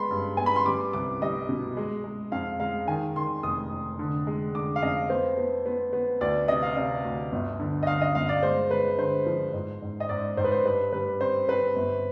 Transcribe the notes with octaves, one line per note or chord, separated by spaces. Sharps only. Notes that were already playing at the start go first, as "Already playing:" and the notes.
Already playing: G#3 B3 B5 C6
G2
B3 G#5
B5
C6
G3 D6
C2 D6
G3 D#5
B2
G#3
G#3
F2 F5
G#3 F5
D#3 G#5
D#3 C6
F1 D#6
F1
D3
G#3
D3 D6
F5
F2 D#5
B3 C5
B3
B3
B3
D2 D5
C3 D#5
F5
C3 D#5
D2
G1
D3
D#5
D3 F5
D#5
G1 F5
D5
G#3 C5
G#3 B4
D3 C5
F3
G#2
G#2
D#5
G#2 D5
G#2 C5
B4
C5
G2 B4
G3 B4
C4 C5
C4 B4
G1